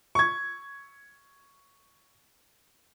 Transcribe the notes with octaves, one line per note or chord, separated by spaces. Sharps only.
C#6 G#6